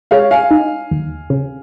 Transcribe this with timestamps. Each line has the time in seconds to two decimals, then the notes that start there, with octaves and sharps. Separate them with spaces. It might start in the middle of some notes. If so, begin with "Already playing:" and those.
0.11 G#3 C#5 F5
0.31 F5 G#5
0.51 D#4
0.91 D#2
1.30 C#3